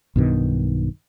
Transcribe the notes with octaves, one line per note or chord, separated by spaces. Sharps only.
B1 G2 B2 D#3